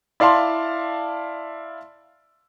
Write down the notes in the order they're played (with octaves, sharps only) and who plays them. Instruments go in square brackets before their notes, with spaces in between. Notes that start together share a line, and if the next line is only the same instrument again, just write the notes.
[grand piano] E4 D5 F5 A5 C6